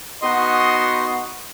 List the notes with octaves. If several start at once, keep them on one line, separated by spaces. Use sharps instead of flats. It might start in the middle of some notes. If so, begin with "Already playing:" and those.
B3 D#4 F#4 D#5 C6